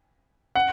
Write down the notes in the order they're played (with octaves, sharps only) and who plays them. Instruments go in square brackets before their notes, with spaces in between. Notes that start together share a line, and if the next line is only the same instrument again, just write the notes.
[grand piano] F#5